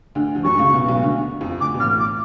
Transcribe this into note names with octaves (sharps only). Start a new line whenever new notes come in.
D2 D3
F3
F#2 F#3 C#6
D3
C#2 C#3
B1 B2
B1 B2
D2 D3
F2 F3
D2 D3 D6
B2
A1 A2 F6
D6